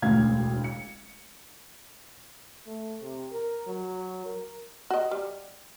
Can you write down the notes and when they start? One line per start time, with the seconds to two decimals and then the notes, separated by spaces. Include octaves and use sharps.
0.02 E1 A1 D2 F5 G#6
0.64 C#7
2.66 A3
3.01 C3
3.32 A#4
3.67 F#3
4.26 A#4
4.90 F#4 D#5
5.11 G3